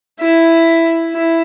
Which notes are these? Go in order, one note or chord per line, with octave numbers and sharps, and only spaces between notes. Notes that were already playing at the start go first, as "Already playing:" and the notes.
E4
E4